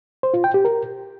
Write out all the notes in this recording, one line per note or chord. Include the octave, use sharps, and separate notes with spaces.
C5
F4
G5
G4
A#4